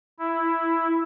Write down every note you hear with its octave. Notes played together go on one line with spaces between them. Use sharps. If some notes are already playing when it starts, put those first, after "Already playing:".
E4